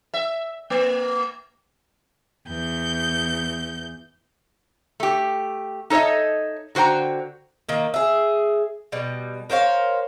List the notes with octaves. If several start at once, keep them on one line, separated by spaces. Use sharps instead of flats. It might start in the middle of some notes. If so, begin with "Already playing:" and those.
E5
A#3
E2 G6
A3 G4
D#4 A4 C#5 D#5 E5
D3 F#4 C5 G5 A#5
D#3 A#3
G#4 E5
B2 G3
A#4 C5 C#5 F5